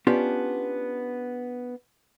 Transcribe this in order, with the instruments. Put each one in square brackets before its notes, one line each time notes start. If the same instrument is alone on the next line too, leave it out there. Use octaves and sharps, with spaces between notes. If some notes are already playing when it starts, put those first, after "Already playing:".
[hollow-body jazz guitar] B3 C#4 D4 F4 G4